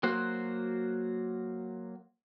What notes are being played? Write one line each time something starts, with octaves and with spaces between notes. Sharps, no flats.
F#3 A#3 F#4 C5